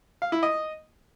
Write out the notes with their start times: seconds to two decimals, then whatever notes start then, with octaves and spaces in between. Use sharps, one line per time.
0.22 F5
0.32 E4
0.43 D#5